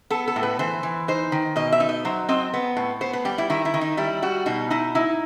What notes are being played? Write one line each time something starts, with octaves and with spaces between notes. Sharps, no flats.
B3 A4
A4
A2
B4
E3 C5
E3
D#4 C5
D#3
B2 D#5
E5
D#4
D#5
F#3 C5
C4 D#5
B3
A2
B3 C5
B4
G3 G4
E4
D#3 E4
E4
D#3
D#4
G3 E4
G3 F#4
B2 D#4
D#4 E4
D#4 E4